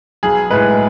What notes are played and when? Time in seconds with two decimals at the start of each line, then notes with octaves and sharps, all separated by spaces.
0.23 B1 G#4
0.51 A2 G#3 B4